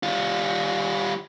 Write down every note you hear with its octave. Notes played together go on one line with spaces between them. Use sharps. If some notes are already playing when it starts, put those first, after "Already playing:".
G3 F4